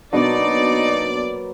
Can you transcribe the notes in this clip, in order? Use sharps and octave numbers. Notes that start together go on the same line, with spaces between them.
B2 F#3 A#3 D4 D#4 B4 D5